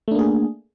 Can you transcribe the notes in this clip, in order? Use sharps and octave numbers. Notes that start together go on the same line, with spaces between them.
A3 A#3 D4 G#4